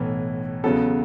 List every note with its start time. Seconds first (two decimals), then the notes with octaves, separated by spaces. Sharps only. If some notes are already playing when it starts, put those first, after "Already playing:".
Already playing: B1 A2 E3 B3 A4
0.64 E2 C#3 F#3 B3 A4